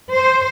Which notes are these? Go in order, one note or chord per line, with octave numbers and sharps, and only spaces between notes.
C5